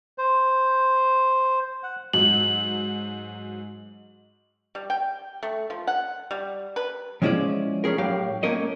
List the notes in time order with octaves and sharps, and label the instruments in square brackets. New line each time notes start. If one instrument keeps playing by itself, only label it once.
[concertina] C5
F#5
[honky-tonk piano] G#2 F#3 [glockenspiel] F#7
[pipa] G3
G5
A3
F3
F#5
G3
B4
[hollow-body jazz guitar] F3 G#3 C#4 E4 G#4 D5
A3 C#4 G#4 A#4
A2 F#3 G4 F5
A3 A#3 C#4 A#4 D#5